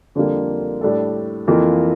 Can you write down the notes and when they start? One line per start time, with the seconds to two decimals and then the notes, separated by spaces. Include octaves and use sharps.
0.15 F2 D3 G3 A#3
0.81 A2 G3 D4 A4
1.48 F2 E3 A#3 F4